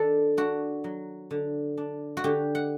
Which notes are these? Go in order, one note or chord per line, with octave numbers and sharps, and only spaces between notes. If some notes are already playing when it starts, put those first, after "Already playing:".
Already playing: D#3 D4 A4
D4 F#4
F#3
D3
D4
F#4
D3 G4
F#5